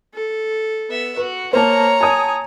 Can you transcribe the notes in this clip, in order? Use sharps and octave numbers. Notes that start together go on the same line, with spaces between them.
A4
B3 E5
F#4 B4
A#3 C5 C#5 A5 A#5
G#5 A5 D#6